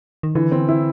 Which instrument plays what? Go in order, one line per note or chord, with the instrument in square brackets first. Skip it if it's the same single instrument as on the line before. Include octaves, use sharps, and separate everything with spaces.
[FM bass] D#3
[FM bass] D3 [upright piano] E3
[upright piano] C4
E4